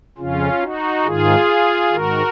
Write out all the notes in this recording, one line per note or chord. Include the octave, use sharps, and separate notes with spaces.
F2 C#3 C#4 F4
D#4 F#4
G#2 D#3 F4 G#4
G#2 D#3 F#4 A#4